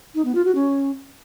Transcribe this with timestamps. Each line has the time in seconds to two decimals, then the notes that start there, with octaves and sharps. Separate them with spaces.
0.15 D#4
0.25 B3
0.35 F4
0.45 F#4
0.55 C#4